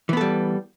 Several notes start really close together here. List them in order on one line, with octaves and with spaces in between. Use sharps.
E3 B3 A4 G3